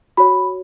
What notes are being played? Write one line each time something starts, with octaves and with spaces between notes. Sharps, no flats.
F#4 C#5 B5